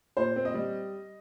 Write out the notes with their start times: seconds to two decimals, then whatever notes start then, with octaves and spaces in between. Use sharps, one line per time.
0.17 A#2 C5
0.36 C4
0.45 D#5
0.54 G3